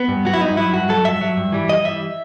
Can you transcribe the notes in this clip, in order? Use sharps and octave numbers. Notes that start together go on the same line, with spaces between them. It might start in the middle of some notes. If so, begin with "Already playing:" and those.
Already playing: B3
G2
F#3 F#4
E4
G2 D#4
F#3 E4
G2 F#4
F#3 A4
G2 E5
F#3
G2
E3 G3
G2 D#5
E3 G3 E5